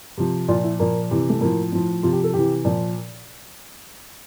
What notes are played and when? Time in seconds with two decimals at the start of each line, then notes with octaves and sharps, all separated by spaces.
0.18 C3 F3
0.48 A#2 F3 F4
0.64 E4
0.80 A#2 F3 A#3
1.11 C3 E3
1.30 A3
1.41 A2 F3 A#3
1.72 A2 F3
2.03 C3 F3 F4
2.13 G4
2.24 A4
2.33 C3 E3 G4
2.65 A#2 F3